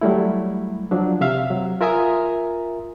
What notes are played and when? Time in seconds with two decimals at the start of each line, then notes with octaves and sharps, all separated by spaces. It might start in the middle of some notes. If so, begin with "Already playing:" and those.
0.01 F#3 G3 A3 E4
0.91 F3 F#3 D4
1.21 C3 E5 F5 E6
1.50 F#3
1.81 F4 A#4 E5 G#5 A#5 D#6